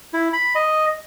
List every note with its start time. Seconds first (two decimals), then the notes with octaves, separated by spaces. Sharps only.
0.13 E4
0.33 B5
0.55 D#5